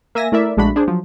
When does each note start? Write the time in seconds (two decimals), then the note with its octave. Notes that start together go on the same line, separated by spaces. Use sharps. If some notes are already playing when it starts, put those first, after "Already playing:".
0.15 A#3 E5 G#5 A#6
0.32 A3 E4 A#4 D5 E5
0.57 A#1 G#3 A3 D4 F#4 B5
0.76 D4 G#4 C5
0.88 F3 F#3